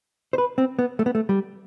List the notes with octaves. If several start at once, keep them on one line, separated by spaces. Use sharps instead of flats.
C5
B4
C4
B3
A3
B3
A3
G3